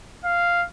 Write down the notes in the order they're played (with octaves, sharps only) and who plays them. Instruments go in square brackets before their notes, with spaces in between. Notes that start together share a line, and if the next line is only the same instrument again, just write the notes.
[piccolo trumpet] F5